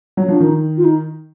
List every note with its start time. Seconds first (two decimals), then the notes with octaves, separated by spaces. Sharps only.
0.17 F#3
0.28 F3 D4
0.40 D#3 D#4
0.77 F4
0.84 D#4